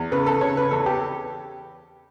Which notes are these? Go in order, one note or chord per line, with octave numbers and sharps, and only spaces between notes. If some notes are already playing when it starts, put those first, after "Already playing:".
Already playing: E2
C#3 B4
A4
C#3 C#5
B4
E2 A4
G4